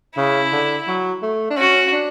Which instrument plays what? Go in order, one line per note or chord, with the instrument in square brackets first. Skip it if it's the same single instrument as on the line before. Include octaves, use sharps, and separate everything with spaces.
[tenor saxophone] C#3 [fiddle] E4
[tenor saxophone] D3
F#3
A3
D4
[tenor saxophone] C#4 [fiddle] F#4
[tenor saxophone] D4